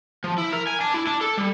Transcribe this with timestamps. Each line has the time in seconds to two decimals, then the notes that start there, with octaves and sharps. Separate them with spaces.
0.24 F3
0.38 E4
0.53 A#4
0.67 G#5
0.81 D4
0.94 E4
1.07 D4
1.21 A4
1.37 G3